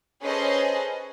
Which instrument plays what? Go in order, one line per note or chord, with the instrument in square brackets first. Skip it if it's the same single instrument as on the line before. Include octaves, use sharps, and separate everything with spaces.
[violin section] C#4 G#4 A4 B4 C5 D#5